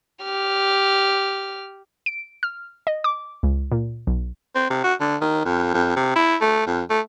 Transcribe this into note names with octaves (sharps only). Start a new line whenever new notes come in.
G4 F6
D7
F6
D#5
D6
C#2
A#2
B1
C4
C3
F#4
D3
D#3
F2
F2
C3
E4
A3
F2
A3